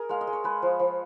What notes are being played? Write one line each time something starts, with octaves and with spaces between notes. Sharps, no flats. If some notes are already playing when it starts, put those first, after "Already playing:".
Already playing: G#4 A#4
G#3 F5
D#5
G#3
C#5
G#3 B4
F3
F3